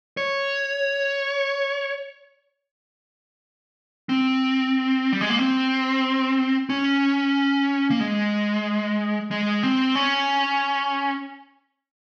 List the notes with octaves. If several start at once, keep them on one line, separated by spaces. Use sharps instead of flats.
C#5
C4
G3
G#3
A#3
C4
C#4
A#3
G#3
G#3
C4
C#4